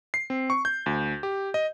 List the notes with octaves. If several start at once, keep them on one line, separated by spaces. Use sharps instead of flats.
C7
C4
C#6
G6
D2
G4
D#5